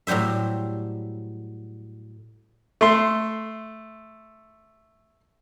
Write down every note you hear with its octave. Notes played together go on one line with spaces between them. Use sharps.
A2 F#3 G3 C5 E5
A3 C6